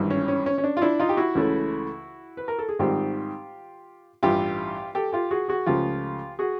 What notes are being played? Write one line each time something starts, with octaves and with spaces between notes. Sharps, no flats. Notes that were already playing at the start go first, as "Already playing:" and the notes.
Already playing: G#1 G2 E3 G3
C#4
C#4
C#4
C#4
D4
F4
D4 E4
D#4 F4
G4
E4 F#4
C#2 C#3 E3 A3 C#4
B4
A#4
A4
G#4
G#2 D#3 G3 C4 F4 G4
A1 G2 E3 F4 G4
G4 A4
F4 G4
F#4 G#4
F#4 G#4
C#2 C#3 F3 A3 F4 G4
F#4 G#4